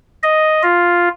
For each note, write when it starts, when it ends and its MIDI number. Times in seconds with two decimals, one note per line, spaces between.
0.23 0.62 75
0.63 1.09 65